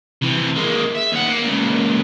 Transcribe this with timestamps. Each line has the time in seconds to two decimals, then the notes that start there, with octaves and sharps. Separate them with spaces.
0.22 C3 E3
0.56 G#3 A#3
0.95 E5
1.12 D#2 F#5
1.29 A#3
1.43 C#2 A#2